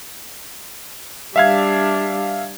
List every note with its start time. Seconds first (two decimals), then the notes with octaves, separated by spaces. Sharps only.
1.36 G3 D4 E5 F5 G#6